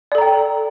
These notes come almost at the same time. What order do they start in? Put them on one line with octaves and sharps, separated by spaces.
D5 A4 A#5 G5